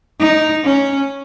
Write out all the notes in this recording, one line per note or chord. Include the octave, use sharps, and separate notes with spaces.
D#4
C#4